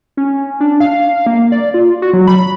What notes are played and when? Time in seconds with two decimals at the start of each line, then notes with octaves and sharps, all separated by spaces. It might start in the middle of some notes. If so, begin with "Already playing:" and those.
0.17 C#4
0.61 D4
0.80 F5
1.27 A#3
1.52 D5
1.74 F4
2.02 F#4
2.13 F#3
2.28 B5